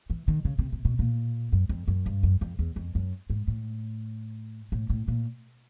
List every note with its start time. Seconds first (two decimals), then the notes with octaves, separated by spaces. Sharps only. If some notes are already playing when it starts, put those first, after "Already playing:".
0.10 E3
0.28 D#3
0.45 C#3
0.59 C3
0.72 C3
0.85 B2
0.99 A#2
1.52 F#2
1.69 F2
1.88 F#2
2.06 G2
2.23 F#2
2.41 F2
2.59 E2
2.76 F2
2.95 F#2
3.30 G#2
3.48 A2
4.72 A2
4.90 A2
5.08 A#2